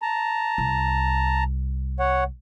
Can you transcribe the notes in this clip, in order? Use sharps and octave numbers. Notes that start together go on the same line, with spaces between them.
A5 A#5
C2
C#5 F#5